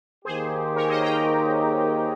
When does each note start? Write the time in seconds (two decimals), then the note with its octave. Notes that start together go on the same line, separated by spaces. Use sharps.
0.25 D#2 D#3 A#3 D#4 G4 G#4 C5
0.75 A#4 C#5
0.88 C5 D#5
1.02 G5 A#5